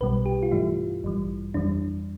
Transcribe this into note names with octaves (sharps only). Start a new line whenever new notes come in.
B1 B2 G3 B4
G4
F4
G2 E3 A3 E4
A1 G2 E3 G3
F2 E3 G3 D4